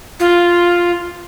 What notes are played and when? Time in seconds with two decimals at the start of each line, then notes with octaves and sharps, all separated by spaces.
0.20 F4